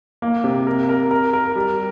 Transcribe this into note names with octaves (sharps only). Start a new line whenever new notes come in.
A#3
C3
A#4
A#4
A#4
A#4
G3